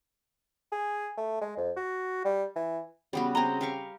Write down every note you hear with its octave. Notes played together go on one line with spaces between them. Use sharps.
G#4
A3
G#3
F2
F#4
G3
E3
C#3 G3 B3 F#4
C4 D#5 A#5
G4 F5 C#6